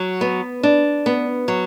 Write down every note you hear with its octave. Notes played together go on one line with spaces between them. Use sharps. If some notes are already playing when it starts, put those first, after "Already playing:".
Already playing: F#3
B3
D4
B3
F#3